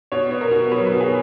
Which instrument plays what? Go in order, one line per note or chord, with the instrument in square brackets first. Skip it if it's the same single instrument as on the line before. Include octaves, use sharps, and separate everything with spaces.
[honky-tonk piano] B2 C#5
B3
A#4
B2
F#3 B4
B2 B4
G#4